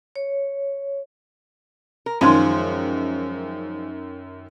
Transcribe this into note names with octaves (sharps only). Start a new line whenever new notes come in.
C#5
A#4
F#2 D#3 F3 G#3 C5